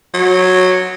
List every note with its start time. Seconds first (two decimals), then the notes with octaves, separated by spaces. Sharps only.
0.14 F#3